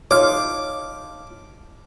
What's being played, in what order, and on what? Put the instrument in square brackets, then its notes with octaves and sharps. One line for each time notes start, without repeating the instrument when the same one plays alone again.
[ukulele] D#4 F4 A4 [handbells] C#5 F6 [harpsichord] D6